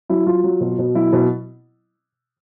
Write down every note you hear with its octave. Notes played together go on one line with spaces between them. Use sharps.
F#3 E4
F#3 F4
F#3
B2
B2
F#3 E4
B2